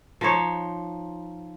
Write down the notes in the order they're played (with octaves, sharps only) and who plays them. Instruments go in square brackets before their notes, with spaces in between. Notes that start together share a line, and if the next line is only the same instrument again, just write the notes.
[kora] F3 D#4 C5 C#5